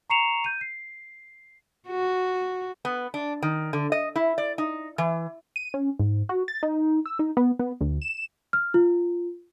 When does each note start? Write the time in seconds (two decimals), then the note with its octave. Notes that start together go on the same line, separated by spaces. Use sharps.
0.10 A#5 C#6 C7 C#7 E7 F7
0.44 G6 D#7
0.61 C7
1.88 F#4
2.85 B3
3.14 D4
3.42 D#3
3.73 D3
3.92 D#5
4.16 E4
4.38 D5
4.58 D#4
4.98 E3
5.56 D#7
5.74 C#4
5.99 G#2
6.29 F#4
6.48 A6
6.63 D#4
7.06 E6
7.19 D#4
7.37 B3
7.59 B3
7.81 D2
8.02 E7
8.53 F6
8.74 F4